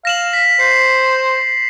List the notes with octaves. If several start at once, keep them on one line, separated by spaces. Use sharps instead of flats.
F5 A#6 E7 F#7
B6
C5 C7